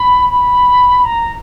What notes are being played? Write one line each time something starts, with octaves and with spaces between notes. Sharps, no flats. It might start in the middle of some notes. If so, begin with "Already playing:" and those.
Already playing: B5
B5
A#5